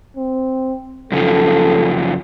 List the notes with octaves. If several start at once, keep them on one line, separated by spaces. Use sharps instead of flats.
C4
F#2 C#3 F3 A4